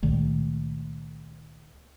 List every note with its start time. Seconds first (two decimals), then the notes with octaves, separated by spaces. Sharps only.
0.03 C#2 A#2 D#3 A3